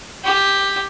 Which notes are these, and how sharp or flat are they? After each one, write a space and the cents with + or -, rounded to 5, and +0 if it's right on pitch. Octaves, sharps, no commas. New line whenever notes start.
G4 +5